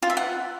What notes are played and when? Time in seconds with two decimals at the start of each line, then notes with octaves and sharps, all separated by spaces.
0.02 F4
0.10 E5
0.17 F#5